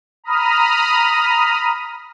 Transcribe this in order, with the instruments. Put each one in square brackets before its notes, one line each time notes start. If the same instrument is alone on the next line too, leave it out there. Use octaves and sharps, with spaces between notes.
[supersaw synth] A#5 B5 D#6 F6